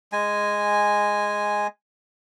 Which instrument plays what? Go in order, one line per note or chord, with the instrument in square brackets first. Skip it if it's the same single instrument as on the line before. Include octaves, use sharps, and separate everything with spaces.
[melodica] G#3 G#5